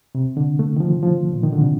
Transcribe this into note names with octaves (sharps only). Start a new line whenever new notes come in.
C3
D3
A3
D#3
F3
F3
A#2
D#3
D3
C3